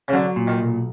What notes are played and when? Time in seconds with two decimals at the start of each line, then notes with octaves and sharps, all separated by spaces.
0.08 C#3
0.13 D3 F#3
0.36 A#2
0.47 D#3
0.59 B1